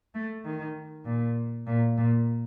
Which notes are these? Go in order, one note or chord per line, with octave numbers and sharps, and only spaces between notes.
A3
D#3
A#2
A#2
A#2